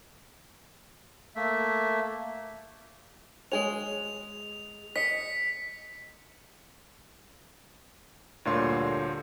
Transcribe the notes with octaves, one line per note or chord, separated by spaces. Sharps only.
A3 A#3 E5
G#3 G#4 C#5 F7
D#5 B6 C#7
D2 G2 A#2 D3 C#5 C6